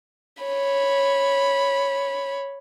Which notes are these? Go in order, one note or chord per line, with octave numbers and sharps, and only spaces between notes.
C#5 B5